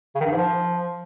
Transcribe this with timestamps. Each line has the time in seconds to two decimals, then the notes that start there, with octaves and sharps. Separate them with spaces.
0.15 C#3
0.20 D#3
0.26 G2
0.32 G#2
0.37 F3